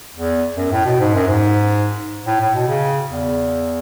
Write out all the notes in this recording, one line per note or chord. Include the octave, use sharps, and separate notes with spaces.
E2
F#2
A2
B2
G#2
F#2
G#2
A2
A2
B2
C#3
E2